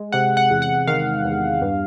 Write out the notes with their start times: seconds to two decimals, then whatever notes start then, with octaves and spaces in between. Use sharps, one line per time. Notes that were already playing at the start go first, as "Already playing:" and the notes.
Already playing: G#3
0.12 C3 F#5
0.37 F#5
0.51 E2
0.62 F#5
0.87 D#3 F5
1.24 E2
1.62 G2